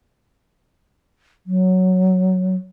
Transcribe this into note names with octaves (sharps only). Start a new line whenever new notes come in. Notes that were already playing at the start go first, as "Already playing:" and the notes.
F#3